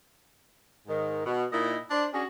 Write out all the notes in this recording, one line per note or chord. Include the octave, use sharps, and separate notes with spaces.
G#2 D#3
B2
A#2 A#3 D#4 E4 D#5
D4 C5
C#4 D4 F#4 G#4